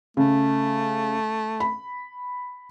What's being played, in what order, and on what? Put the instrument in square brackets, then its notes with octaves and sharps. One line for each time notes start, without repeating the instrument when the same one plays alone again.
[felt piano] C#3 [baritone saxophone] A3
[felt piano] B5